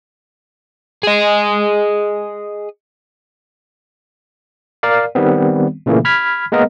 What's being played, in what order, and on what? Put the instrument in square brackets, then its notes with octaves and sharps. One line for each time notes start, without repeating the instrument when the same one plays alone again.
[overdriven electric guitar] G#4 D#5
[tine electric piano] A#4 D5 F5
D#3 G3 B3 C4
A#2 C#3 E3 A3 A#3
B5 F6 G#6 B6
G#3 A#3 B3 A#4 D#5